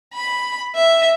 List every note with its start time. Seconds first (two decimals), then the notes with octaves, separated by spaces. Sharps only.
0.14 B5
0.75 E5